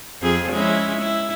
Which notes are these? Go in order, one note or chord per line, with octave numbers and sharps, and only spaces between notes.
F2 G#4
G#3 C#4 E4
E4